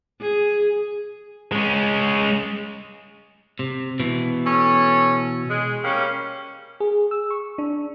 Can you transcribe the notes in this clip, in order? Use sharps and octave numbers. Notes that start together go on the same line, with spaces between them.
G#4
G#3 C#4
C3
B2 E3
C#4 A4 C#5
G#3
G3 A#3 C#4
G#4
E6
C#6
D4